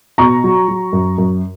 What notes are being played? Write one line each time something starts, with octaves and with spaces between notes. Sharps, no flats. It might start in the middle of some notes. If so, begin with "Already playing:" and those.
B2 A#5 C#6
F#3
F#3
F#2
F#2